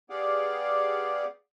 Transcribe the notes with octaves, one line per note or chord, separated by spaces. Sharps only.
B3 G4 G#4 D5 F5 F#5